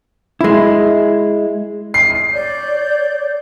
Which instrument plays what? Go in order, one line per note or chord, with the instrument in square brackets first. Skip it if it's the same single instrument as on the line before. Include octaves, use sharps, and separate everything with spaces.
[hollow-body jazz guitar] G#3 E4
[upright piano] C7
[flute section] C#5 D5 G6